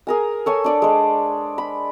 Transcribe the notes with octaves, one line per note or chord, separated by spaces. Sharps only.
G#4 A#4 G#5
A4 C#5 G#5
D4 D5 D6
G#3 C5
B5